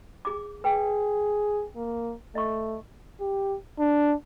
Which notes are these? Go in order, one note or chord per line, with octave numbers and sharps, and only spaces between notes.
G#4 D6
G#4 B4 G5
A#3
A3 D#5 C#6
G4
D4